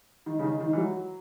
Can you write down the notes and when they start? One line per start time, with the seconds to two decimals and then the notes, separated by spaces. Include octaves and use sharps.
0.26 D#3
0.39 C#3
0.44 D#3
0.60 D#3
0.73 E3
0.77 F#3